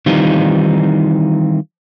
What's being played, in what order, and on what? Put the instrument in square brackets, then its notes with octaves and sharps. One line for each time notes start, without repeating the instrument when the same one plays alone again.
[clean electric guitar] D#3 E3 G3 C4 D#4 F4